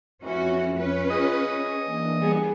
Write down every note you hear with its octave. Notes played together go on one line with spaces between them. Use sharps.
F2 E3 C#4 F#4
C#4 B4
F4 G#4 D#5
C#6
E3 A#3 D4
G3 B3 G#4